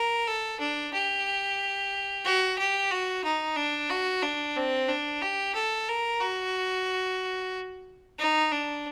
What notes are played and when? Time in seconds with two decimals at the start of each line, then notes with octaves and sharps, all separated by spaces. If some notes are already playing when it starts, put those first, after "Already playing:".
Already playing: A#4
0.27 A4
0.60 D4
0.94 G4
2.25 F#4
2.58 G4
2.91 F#4
3.24 D#4
3.57 D4
3.90 F#4
4.23 D4
4.57 C4
4.89 D4
5.22 G4
5.55 A4
5.89 A#4
6.21 F#4
8.19 D#4
8.52 D4